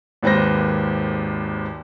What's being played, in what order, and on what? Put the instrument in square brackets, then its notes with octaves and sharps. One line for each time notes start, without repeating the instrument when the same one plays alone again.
[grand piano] G#1 D#2 B4 C5 A#6